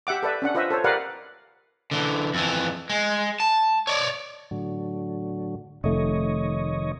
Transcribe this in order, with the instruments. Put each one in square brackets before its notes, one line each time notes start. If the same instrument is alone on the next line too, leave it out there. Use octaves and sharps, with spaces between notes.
[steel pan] G4 E5 F#5 D6
A4 B4 D5 E5
C#4 D4 F#5
F4 B4 C5 D#5 E5
A4 C5 C#5
G4 A#4 B4 D5 F5 F#5
[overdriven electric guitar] D3 E3
F2 E3
G#3
A5
C#5 D5
[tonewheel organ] A2 D3 F#3
[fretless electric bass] F1 A3 [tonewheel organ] D#3 C#5 D#5